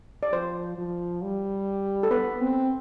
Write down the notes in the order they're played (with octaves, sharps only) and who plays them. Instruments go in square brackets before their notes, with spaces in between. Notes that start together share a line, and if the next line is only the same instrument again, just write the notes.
[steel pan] D5
[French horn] F3 [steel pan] C5
[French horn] F3
G3
[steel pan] A4
[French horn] B3 [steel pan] B4
[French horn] C4